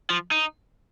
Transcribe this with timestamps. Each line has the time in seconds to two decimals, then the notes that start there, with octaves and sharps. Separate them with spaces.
0.10 F3
0.31 D#4